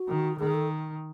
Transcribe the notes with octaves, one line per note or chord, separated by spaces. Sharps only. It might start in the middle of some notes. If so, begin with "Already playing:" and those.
Already playing: F#4
D#3
D#3 G#4
A4